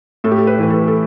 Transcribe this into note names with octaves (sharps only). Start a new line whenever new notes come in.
A2 A4
G4
A4
B4
E3 B4
A4
A4